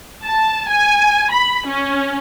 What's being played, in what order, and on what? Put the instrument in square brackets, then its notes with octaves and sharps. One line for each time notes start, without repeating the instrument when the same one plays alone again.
[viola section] A5
G#5
B5
C#4